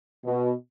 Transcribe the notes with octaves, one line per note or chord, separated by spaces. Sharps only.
B2